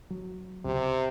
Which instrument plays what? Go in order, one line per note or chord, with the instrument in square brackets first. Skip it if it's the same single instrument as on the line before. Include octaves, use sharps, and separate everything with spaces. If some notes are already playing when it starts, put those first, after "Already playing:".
[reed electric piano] F#3
[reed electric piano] C#2 [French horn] C3